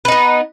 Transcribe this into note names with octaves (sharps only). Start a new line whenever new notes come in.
B3 D#4 B4